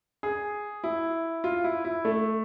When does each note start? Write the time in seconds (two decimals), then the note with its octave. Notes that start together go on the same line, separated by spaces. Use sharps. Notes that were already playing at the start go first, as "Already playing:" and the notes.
0.23 G#4
0.84 E4
1.44 F4
1.64 E4
1.84 E4
2.05 A3